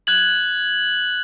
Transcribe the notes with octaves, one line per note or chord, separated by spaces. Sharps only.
F#6 G#6 F#7